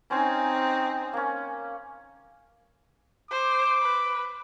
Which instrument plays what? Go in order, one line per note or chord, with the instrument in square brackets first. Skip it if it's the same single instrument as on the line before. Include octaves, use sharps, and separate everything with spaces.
[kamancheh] C4 D#4 [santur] C#4 C5 G#5
[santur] A#3 C#4
[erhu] C5 [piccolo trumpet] D6
[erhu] B4